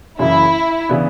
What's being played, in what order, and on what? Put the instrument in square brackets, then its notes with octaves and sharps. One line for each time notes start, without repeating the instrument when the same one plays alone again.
[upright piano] F#1 F#2 C#3 E3 [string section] E4
[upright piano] C#3 E3 B3 D4